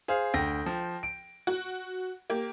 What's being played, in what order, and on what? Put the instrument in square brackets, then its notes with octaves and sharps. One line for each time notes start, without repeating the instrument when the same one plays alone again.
[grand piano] G#4 C5 F5
[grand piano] D2 A#6 [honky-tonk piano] G5
[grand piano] F3
D7
[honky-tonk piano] F#4
A#3 G4